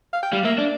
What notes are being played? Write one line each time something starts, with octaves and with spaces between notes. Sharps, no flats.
F5
G5
G3 F5
A#3 E5
D4 D5